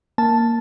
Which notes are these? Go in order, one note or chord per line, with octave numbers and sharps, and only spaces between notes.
A#3 A5